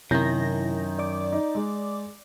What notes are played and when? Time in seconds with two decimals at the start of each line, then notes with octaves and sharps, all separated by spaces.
0.11 F#2 C3 D#3 E4 G6 A#6
0.99 D5 D6
1.32 D#4
1.55 G#3